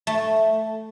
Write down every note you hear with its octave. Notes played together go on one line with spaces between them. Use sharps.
A3